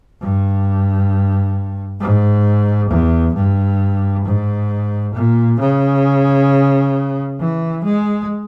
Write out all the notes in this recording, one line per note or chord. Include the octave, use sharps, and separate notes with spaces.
G2
G#2
E2
G2
G#2
A#2
C#3
E3
G#3